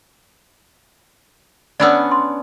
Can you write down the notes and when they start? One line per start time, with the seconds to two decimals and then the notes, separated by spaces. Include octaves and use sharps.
1.80 B3 C#4 D4 D5 B5 E6
2.11 C6